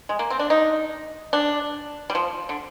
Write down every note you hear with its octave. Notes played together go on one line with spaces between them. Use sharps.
G#3
A#3
C4
D4
D#4
D4
G3
F3
D3